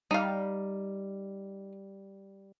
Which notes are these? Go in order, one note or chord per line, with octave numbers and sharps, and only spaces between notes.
G3 D#4 F5